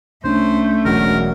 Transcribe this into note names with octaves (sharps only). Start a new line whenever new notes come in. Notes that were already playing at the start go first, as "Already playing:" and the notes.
C2 A3 C#4 D4 C5
E1 F#3 A#4